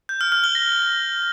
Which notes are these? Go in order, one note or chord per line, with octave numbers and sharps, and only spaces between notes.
G6
F6
F6
G7
A#6